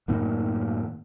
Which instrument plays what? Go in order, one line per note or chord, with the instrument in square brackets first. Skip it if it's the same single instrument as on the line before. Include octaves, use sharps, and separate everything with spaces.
[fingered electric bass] F#2 A2 D#3 A#3